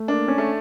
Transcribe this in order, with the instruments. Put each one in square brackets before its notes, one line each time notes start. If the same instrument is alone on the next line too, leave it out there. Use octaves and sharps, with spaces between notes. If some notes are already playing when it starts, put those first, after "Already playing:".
Already playing: [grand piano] A3
[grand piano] A#3 [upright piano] D4
[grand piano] C#4
[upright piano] A3